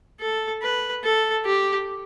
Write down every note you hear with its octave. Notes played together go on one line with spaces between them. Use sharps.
A4
B4
A4
G4